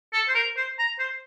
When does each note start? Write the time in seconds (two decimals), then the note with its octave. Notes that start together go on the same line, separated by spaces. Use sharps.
0.13 A4
0.28 C5
0.35 A#4
0.56 C5
0.79 A#5
0.99 C5